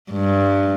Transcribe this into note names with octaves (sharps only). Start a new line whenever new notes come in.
G2